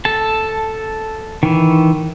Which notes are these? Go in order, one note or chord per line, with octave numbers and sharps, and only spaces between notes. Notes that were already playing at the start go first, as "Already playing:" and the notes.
A4 A5
D#3 E3